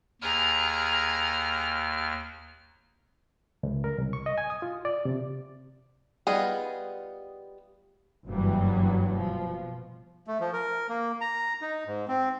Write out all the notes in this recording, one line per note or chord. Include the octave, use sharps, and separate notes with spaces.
D#2 G#4 A#5 F6
C#2
A#4
C2
C#6
D#5
G#5
D#6
F4
D5
C3
G3 B3 D#4 F4 G#4
F#1 G2 E3 F#3 G3
B2 F3
A3
F3
A#4
A#3
A#5
D#4
G#2
C4